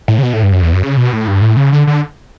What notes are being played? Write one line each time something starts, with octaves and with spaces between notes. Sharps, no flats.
A2
C#3
B2
A2
G2
F#2
E2
F#2
C#3
B2
A2
G2
A2
C#3
D3
D3